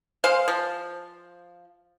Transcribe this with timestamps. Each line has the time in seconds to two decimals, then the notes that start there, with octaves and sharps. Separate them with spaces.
0.24 G#3 C5 F5
0.48 F3